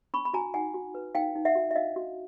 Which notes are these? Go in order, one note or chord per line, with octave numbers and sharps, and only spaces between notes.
D4 B5 C#6
B5
F#4 G#5 A#5
D#4 F#5 G#5
F#4
B4
D#4 F5 G5
D#4
E5 F#5
F#4
E5
D4 D#5 F5
F#4